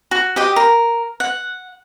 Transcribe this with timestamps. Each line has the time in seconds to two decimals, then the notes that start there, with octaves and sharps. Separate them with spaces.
0.11 F#4
0.36 G4 D#5 G5
0.56 A#4
1.20 F#5